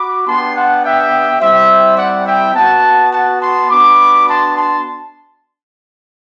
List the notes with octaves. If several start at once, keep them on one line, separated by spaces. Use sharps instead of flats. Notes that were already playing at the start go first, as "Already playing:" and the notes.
Already playing: F#4 B5 D6
B3 D4 G4 A5 C6
F#5 A5
E5 G5
G3 C4 E4 G4 C5 E5
D5 F#5
E5 G5
B3 F#4 F#5 A5
F#5 A5
A5 C6
B3 D4 F#4 B5 D6
A5 C6
A5 C6